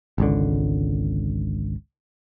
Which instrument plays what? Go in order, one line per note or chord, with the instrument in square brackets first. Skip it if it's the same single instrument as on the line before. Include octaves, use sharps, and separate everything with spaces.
[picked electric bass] G#1 C#2 D3